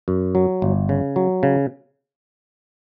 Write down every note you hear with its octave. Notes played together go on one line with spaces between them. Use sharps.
F#2
F#3
G1
C#3
F#3
C#3